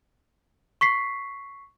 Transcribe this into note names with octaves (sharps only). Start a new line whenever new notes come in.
C#6 B6 C7